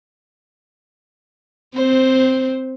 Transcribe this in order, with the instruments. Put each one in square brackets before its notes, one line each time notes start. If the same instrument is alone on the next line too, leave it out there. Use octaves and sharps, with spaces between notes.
[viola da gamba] C4 [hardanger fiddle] C5